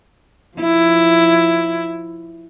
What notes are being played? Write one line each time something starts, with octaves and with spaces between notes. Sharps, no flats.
F3 E4